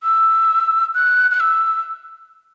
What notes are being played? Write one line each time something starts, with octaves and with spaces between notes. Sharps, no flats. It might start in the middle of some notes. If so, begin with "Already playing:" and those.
E6
F#6
F#6
E6